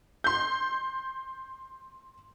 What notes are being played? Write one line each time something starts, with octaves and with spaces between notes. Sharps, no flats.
C6 G6